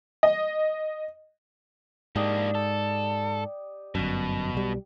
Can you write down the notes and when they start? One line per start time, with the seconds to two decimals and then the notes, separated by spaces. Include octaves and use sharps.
0.23 D#5
2.16 G#2 A#3 D4 G4 D5 D#5
2.55 A4
3.95 G1 F#2 B2
4.54 B1 G3